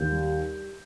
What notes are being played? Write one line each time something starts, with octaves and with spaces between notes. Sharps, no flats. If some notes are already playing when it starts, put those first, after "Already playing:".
Already playing: D#2 G6
G3